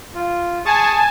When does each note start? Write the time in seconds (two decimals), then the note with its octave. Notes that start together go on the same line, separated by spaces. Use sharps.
0.15 F4
0.66 G#4 G#5 A5 C#6 D#6